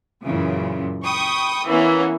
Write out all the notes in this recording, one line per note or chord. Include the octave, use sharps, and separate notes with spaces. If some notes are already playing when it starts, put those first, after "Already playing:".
F#2 A#2 C#3 E3
G5 B5 C#6 D#6
E3 A#3 B3 C#4